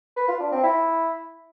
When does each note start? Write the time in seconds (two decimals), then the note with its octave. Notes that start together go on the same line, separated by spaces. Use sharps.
0.16 B4
0.28 F4
0.40 D4
0.52 C4
0.63 E4